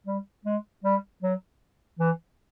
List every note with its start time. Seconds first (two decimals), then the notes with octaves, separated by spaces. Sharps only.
0.06 G3
0.45 G#3
0.84 G3
1.22 F#3
1.99 E3